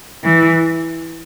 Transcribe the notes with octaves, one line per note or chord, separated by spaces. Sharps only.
E3